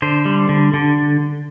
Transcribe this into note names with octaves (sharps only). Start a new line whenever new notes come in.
D3 C5
G3
D3
D3